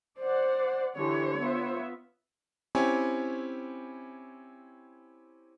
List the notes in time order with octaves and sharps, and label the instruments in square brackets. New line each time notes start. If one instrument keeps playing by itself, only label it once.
[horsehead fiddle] C5 [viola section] D5 F#5
[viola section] D3 E3 G4 [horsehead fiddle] C#5
[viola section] B3 F4 E5
[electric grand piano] C4 C#4 E4 G4 C#5 G#5